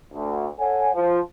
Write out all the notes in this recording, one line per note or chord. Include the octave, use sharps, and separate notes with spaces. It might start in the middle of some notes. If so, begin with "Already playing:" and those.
D2
A4 C#5 F#5 G#5
F3